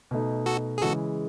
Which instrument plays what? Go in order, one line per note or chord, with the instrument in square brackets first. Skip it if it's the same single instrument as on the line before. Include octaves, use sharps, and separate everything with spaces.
[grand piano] B2 A3 D#4
[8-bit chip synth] F#4 A4
G#4
[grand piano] C#3 E3 G#3 [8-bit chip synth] F#4 A4